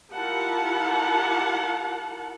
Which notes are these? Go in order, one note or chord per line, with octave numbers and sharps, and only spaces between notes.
E4 F4 G4 A#4 F#5 A5